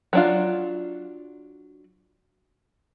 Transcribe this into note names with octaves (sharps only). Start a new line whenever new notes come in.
F#3 D4 F4